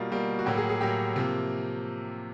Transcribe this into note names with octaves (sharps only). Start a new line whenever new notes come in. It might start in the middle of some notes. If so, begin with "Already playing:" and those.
Already playing: B2 G3 A#3 F4
B2 G3 A#3
F#4
A2 F#3 A#3 G4
G#4
G#4
A2 F#3 A#3 G4
C3 F3 A#3